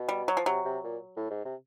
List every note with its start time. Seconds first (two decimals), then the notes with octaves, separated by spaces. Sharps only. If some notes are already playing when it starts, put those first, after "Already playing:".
Already playing: B2
0.09 G3
0.28 F#3
0.37 F3
0.46 C3 F#3
0.65 C3
0.84 A#2
1.16 A2
1.31 G#2
1.45 C3